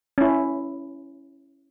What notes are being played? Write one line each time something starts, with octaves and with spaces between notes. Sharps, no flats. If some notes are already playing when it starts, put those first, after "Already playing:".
C#4 E4